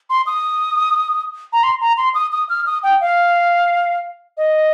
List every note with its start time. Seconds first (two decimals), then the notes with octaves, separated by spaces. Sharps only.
0.10 C6
0.26 D#6
1.53 A#5
1.63 C6
1.81 A#5
1.97 C6
2.15 D#6
2.32 D#6
2.49 F6
2.66 D#6
2.83 G5
3.01 F5
4.37 D#5